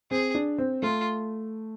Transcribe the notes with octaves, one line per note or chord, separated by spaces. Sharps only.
C4 G#4
D4
C4
A3 F4